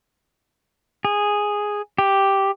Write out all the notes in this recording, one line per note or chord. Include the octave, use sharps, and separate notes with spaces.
G#4
G4